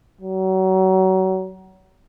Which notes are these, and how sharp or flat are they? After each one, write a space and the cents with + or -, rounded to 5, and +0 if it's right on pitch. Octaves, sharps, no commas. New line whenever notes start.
F#3 +30